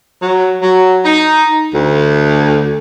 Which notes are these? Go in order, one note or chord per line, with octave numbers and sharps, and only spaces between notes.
F#3
F#3
D#4
D2